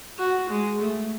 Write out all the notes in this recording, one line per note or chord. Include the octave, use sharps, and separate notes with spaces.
F#4
G#3
A3